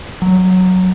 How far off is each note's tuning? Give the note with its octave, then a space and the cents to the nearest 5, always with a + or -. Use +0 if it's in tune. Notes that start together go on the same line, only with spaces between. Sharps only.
F#3 +0